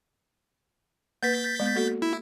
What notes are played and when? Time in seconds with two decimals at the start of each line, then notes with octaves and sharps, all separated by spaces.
1.23 A#3 B4 G6 A6 B6
1.60 G#3 B3
1.75 A#3 F#4 A4
2.02 E4